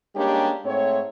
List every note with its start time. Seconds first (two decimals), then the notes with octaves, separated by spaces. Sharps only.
0.15 G3 G#3 A#3 C#4 D4 G4
0.65 G#2 A3 C4 C#5